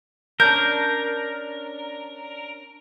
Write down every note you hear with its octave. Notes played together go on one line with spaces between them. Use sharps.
C#4 D4 A#4 G6